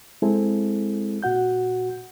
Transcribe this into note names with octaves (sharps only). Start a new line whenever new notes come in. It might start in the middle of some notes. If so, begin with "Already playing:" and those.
G#3 C4 E4 G#4 A4
A#2 F#4 F#5 G6